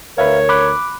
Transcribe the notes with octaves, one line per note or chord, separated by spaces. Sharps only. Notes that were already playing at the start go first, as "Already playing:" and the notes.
D2 A#4 B4 C#5 E5 F5
B5 D6 F#6